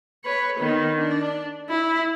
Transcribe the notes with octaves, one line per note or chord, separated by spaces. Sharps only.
B4 C#5
D#3 B3
D4
E4